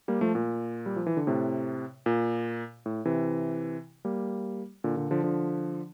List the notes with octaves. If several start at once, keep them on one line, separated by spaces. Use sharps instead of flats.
G3 A#3
F3 A3
A#2
G3
F3
E3
D3
A2 C3
A#2
A2
C3 E3
G3 A#3
A#2 D3
A#2 D3
D3 F3
D3 F3